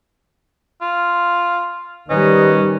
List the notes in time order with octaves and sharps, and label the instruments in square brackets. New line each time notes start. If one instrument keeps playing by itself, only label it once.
[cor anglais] F4
[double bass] D#3 G3 [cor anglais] C#4 [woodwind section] D#4 B4 D#5